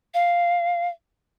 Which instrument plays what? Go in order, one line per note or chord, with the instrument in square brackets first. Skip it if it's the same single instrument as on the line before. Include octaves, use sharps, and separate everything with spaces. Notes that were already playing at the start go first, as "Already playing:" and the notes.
[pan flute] F5